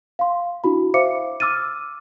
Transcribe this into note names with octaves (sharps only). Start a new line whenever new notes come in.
F5 C6
D4 E4 F#4 B5
C5 E5 F5 D6 C#7
D6 E6 F6 A6 D#7